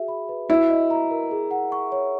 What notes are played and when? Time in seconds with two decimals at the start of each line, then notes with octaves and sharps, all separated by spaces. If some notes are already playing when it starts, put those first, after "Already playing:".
Already playing: F#4 G#4 E5
0.08 B5
0.29 B4
0.49 E4 F#4
0.70 D#5
0.90 A#5
1.11 A#4
1.31 G#4
1.51 F#5
1.72 C#6
1.92 C#5